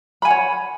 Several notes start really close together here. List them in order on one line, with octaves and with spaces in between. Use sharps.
B5 G#5 F#5 C#5